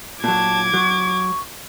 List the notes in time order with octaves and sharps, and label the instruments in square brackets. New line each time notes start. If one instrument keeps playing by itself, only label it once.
[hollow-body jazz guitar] A#2 F#3 [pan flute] A5 [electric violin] D6 G#6
[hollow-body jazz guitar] F#3 [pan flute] C#6